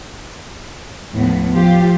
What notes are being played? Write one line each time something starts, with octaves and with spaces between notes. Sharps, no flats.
D#2 A2 F3 B3
F3 F4 G4